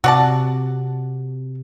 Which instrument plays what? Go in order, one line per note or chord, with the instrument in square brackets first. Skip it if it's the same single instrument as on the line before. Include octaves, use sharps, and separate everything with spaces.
[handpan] C3 [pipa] F#4 D5 A5